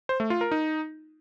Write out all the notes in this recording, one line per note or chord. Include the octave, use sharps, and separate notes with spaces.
C5
A3
F4
A#4
D#4